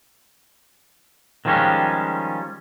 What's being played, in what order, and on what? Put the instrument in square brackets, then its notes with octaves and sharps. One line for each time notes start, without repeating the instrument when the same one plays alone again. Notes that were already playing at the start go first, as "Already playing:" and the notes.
[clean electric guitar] D#3 F3 G3 G#3 C#4 G4